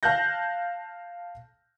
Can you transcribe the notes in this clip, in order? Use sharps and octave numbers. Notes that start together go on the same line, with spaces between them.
F5 A5 F#6 G6 A#6